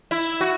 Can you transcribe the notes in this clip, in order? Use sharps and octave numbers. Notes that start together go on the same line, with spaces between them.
E4
F#4